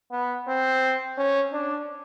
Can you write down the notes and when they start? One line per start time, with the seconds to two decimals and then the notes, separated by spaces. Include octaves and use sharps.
0.12 B3
0.48 C4
1.18 C#4
1.53 D4